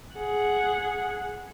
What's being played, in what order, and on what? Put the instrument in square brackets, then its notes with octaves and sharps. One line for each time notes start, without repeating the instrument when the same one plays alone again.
[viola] G#4 F#5